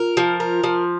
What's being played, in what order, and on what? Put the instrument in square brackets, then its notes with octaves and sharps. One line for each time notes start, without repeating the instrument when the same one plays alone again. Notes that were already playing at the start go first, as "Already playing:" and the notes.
Already playing: [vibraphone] F4 [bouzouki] A#4
[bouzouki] F3
A#4
F3